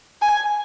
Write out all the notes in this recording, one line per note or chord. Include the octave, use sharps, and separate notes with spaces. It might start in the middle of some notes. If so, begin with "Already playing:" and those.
G#5